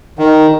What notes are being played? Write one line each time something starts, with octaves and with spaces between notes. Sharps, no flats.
D#3